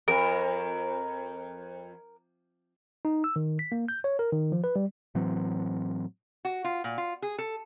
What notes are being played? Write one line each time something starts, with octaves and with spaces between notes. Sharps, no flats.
F2 A#4
D#4
E6
D#3
B6
A#3
G6
C#5
A#4
D#3
F3
B4
G3
A2 E3 F#3 C4
F#4
F4
A#2
F4
G#4
A4